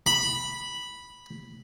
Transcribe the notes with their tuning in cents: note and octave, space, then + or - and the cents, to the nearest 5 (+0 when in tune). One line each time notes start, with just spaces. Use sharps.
B5 -5